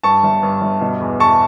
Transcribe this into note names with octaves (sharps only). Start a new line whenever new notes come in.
G2 A5 C#6
G1
G2
G1
B2
E2
E2 A5 C#6